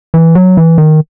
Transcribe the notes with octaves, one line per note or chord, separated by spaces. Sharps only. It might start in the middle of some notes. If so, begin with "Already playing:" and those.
E3
F#3
E3
D#3